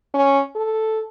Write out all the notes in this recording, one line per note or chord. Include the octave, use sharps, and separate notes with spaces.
C#4
A4